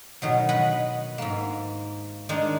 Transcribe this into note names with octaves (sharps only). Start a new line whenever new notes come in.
B2 D#3 F#3
B4 D#5 F#5 G#5 B5
G#2 A#3
D#3 G#3 D4 D#4